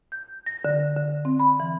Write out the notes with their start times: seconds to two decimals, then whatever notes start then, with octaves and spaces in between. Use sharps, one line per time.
0.12 G6
0.46 A#6
0.65 D3
0.96 D3
1.25 C4
1.39 B5
1.60 E3